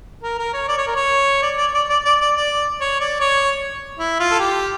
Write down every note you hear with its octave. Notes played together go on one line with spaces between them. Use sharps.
A#4
A#4
C#5
D5
C#5
A#4
C#5
D5
D5
D5
D5
D5
D5
D5
C#5
D5
C#5
E4
F4
A4
G4